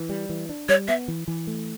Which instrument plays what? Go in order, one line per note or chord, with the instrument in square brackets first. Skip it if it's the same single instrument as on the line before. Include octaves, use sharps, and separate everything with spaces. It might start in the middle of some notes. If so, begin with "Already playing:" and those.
Already playing: [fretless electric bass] E3
G3
E3
D4
[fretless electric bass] G3 [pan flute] C#5
[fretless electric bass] B3 [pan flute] E5
[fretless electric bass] E3
E3
A3